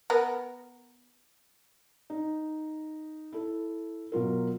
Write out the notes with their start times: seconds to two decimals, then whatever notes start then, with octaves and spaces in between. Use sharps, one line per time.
0.10 B3 A#4
2.10 D#4
3.33 E4 A4
4.12 B2 F#3 F4 A#4